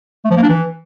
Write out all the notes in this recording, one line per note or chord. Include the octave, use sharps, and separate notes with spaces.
A3
F3
A#3
D4
E3